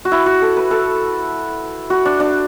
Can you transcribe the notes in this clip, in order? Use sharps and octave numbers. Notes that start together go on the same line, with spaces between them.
F#4
E4
F#4
A4
B4
A4
F#4
D4
D4